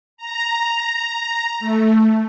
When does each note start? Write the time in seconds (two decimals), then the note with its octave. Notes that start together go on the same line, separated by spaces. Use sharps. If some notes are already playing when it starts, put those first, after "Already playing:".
0.17 A#5
1.59 A3